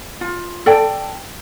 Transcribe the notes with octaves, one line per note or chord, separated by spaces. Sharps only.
F4
A4 D5 G5